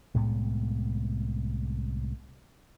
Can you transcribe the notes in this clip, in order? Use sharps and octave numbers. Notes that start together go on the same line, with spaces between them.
C2 A2 G#3 B3